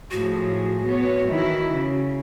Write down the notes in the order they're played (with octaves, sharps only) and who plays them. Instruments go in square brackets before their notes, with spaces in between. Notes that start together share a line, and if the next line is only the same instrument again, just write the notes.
[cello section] A2 F3 G#4 [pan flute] F#4
[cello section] B3 C#5
D#3 E3 E4
C#3